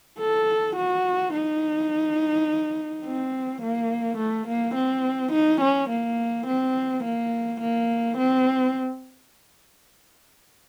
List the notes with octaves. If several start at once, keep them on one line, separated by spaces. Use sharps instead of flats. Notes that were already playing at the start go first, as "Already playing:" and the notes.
A4
F#4
D#4
C4
A#3
A3
A#3
C4
D#4
C#4
A#3
C4
A#3
A#3
C4